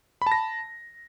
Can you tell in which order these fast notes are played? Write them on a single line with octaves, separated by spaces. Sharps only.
B5 A5 A#6